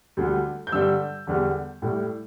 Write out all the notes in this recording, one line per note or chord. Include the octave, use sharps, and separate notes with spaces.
D2 D3 G3
G6
G2 D3 G3 E6
E2 D3 G3
A2 G3